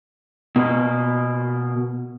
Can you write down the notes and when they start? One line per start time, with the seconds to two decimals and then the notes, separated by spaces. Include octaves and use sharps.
0.56 B2 A#3